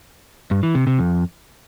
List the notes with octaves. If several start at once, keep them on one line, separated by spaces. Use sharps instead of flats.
G2
E3
C3
C3
F2